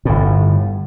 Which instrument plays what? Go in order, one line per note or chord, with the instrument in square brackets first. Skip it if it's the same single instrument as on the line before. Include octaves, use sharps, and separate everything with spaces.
[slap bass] G1 A2